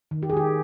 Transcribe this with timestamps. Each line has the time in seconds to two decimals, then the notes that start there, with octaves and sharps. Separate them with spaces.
0.11 D#3
0.23 G4
0.30 G#4
0.33 D#3 G4